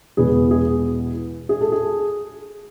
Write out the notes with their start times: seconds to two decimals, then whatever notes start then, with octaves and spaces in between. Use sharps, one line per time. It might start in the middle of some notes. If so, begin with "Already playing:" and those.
0.17 E2 B2 G#3 B3 G#4
0.51 G#4
1.49 G#4
1.61 A4
1.72 G#4